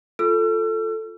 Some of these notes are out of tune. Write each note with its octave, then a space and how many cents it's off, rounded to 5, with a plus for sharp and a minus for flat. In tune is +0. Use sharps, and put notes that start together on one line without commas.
F4 +0 A4 +0 E6 +45